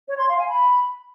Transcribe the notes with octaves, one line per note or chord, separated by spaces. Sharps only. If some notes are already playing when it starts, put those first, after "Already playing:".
C#5
C6
F5
G#5
B5